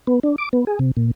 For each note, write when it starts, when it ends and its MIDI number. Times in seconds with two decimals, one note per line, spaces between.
0.07 0.20 59
0.23 0.36 62
0.38 0.49 86
0.53 0.65 59
0.67 0.79 68
0.79 0.91 48
0.97 1.11 46